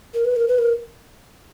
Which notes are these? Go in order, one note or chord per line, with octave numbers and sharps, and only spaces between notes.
A#4
B4
A#4
B4
A#4